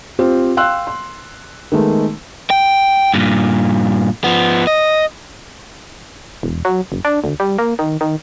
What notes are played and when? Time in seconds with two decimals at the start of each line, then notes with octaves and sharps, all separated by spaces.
0.19 C4 F4 G4 C5
0.57 F5 G5 C6 E6 F#6
0.87 C6
1.72 D#3 G#3 A3 B3
2.50 G5
3.14 G2 A#2
4.24 F3 B3
4.67 D#5
6.43 E1
6.65 F#3
6.92 F#1
7.05 D4
7.24 D2
7.40 G3
7.58 A#3
7.79 D#3
8.01 D#3